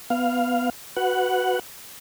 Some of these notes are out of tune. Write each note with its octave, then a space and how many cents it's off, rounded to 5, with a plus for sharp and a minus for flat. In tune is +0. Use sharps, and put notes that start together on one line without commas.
B3 +10 F5 +0
F#4 +0 B4 +5 F#5 +0